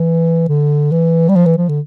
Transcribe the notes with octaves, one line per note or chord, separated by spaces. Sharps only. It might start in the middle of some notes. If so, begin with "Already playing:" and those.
Already playing: E3
D3
E3
G3
F3
E3
F3
D3